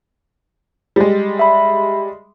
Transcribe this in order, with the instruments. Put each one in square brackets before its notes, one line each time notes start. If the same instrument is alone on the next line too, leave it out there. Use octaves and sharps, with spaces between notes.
[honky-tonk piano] G3 G#3
[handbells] E5 B5